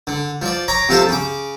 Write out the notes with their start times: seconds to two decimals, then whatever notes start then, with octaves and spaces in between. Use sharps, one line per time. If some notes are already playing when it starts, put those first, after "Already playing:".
0.07 D3
0.42 F3 D5
0.68 C#5 A#5 D6
0.89 C3 F3 F4 A4
1.09 C#3 D6